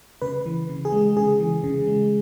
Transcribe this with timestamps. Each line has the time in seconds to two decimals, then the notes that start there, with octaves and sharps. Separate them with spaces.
0.22 C#3 B4
0.46 E3
0.70 C#3
0.85 G#4
0.93 G#3
1.16 C#3 G#4
1.40 E3
1.64 C#3
1.87 G#3